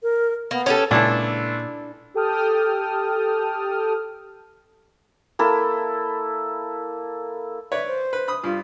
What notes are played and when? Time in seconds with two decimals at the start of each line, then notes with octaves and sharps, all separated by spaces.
0.03 A#4
0.51 A#3 B3
0.66 C#4 G4 A4
0.91 C#2 A#2 D4 E4 A4
2.14 G4 A4 G5 A5 D#6 F6
5.39 A#3 E4 A4
7.72 B4 C#5 D5 E5
7.87 C5
8.13 B4
8.28 B5 D#6
8.44 G2 F4